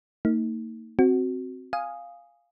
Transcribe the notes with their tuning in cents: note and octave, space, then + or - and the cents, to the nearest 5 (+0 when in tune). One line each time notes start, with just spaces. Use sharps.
A#3 -45 D#4 +20
C4 +0 F#4 +0
F5 +0 G#5 -10 D#6 +0